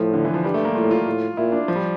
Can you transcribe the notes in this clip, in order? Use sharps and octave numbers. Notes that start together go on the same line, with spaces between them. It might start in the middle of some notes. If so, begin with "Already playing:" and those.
Already playing: A2 F3
D3
E3
F3
G2 G3
A3
A#3
A2 F4
F4
A2
A#2 E4
D4
F3
G3